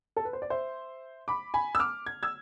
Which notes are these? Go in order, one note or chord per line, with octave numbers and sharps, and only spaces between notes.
A4
B4
C5
D5
C5 E5
B5 D6
G#5 B5
E6
D6 F6
G#6
E6 G#6